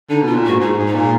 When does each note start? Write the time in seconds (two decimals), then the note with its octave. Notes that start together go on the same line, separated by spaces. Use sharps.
0.10 D3 D#4
0.22 B2 F4
0.36 A#2
0.44 G#2 F#4
0.60 G#2 D#4
0.78 G#2
0.86 D#4
0.95 A#2